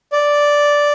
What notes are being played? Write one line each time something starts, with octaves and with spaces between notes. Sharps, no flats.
D5